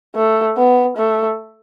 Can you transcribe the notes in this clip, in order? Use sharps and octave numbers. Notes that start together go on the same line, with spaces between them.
A3
B3
A3